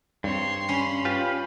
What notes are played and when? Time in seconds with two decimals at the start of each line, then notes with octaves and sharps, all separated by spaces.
0.24 G2 C4 C#5 C6
0.69 C#4 B5
1.05 F4 G4 B4